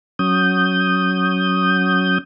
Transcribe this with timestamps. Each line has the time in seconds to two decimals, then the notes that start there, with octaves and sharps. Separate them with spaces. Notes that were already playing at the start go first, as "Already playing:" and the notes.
0.19 F#3 C#4 D#6 G6